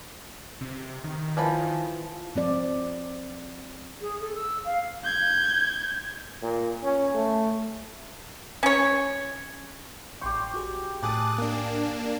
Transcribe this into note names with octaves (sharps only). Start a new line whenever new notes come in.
C3
D#3
E3 F3 B5
F3 C4 D5
G#4
A4
E6
F5
G6 G#6
A#2
C#4
A3
C#4 C#5
A1 G4 G5 C6 C#6
F#4 G#4
A2 A4 G#5 D6 D#6 F#6 A6
A#3 D4